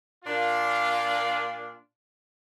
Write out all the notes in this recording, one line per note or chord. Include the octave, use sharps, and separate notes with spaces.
A#2 D4 F4